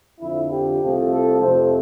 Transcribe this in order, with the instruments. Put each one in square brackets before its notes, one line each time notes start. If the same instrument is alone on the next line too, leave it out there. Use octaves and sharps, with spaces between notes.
[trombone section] F2 D3 F3 E4
G4
C2 C3 F3 A3
A4
F2 C3 F3 A3 C5